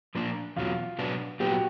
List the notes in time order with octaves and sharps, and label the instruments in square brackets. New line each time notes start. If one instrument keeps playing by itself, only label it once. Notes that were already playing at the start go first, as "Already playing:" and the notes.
[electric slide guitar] A#2 F3 A#3 D4 F4
[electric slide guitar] E2 B2 F#3 [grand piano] F4
[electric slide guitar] B2 F#3 B3 D4
[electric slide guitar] A#2 F#3 B3 [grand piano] G4
[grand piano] F#4